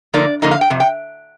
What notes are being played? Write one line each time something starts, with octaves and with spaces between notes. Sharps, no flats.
D3 F3 A#3 D#4 D5
D3 F3 A#3 D#4 D#5
F5
G5
F2 C3
G5